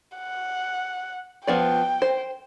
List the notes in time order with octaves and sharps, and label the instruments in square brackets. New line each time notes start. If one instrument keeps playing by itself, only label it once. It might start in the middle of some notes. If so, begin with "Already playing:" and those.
[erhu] F#5
[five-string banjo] F3 B3 D5 [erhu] G5
[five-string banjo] C5